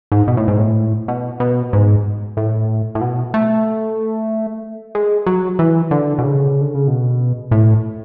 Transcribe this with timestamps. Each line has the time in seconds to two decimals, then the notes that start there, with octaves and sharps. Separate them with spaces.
0.12 G#2
0.28 B2
0.37 A2
0.48 G#2
0.58 A2
1.08 B2
1.40 B2
1.73 G#2
2.37 A2
2.95 A2
3.01 B2
3.34 A3
4.95 G#3
5.26 F#3
5.59 E3
5.91 D3
6.18 B2
6.23 C#3
6.61 D3
6.75 C#3
6.88 B2
7.51 A2